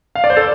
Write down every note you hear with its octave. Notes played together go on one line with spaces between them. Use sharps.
F5
D5
C5
A4